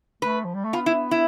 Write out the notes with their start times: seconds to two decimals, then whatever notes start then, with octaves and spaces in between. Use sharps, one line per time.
0.22 A3 B4
0.45 F3
0.55 G3
0.65 A3
0.73 B3 F4
0.86 E4
1.11 E4